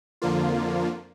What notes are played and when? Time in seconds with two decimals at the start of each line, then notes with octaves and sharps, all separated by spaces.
0.22 F2 D3 F3 A#3 F4